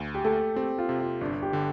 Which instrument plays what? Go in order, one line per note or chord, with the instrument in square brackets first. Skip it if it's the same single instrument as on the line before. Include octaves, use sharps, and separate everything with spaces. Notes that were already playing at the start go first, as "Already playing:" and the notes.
Already playing: [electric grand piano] D2
[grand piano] G4
[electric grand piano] A3 [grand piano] A4
[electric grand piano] C4 [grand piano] G4
[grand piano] F4
[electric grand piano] C3
[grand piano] F4
[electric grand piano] G1 [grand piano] D4
[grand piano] G4
[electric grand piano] D3